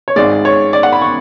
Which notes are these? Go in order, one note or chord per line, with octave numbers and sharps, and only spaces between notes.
C#5
G#1 G#2 G#3 D5
C#5
D5
F#5
B5
C#6